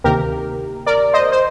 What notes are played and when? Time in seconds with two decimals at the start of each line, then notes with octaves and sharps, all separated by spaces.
0.04 D2 C3 D#3 A#3 G4 A#4
0.86 A#4 D5
1.13 C5 D#5
1.32 C5